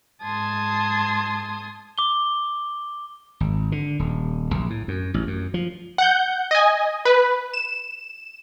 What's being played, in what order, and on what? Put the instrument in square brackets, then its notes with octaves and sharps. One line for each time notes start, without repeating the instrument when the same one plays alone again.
[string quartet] G#2 A5 C6 D#6 G#6
[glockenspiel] D6 G7
[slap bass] G#1
D3
D#1
A#1
A2
F#2
A1
F#2
F3
[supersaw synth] F#5 G6
D#5 G#5
B4
E7